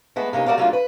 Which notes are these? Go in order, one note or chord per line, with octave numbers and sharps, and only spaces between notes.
G#3 A3 B3
C3 A#3 C#4 D#4
A3 F#4 A#4 D5 F5
F#3 A3 A#3 C#4 D4 F4
B4